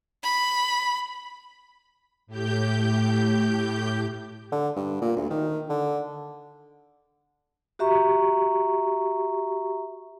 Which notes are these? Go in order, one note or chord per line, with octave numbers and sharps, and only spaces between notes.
B5
A2 G4 G6
D3
G2
A#2
D2
D#3
D3
F#4 G4 E5 A#5 C#6